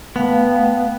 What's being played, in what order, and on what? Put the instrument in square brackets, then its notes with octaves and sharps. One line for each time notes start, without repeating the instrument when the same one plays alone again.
[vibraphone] A3 F5 G5 [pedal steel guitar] B3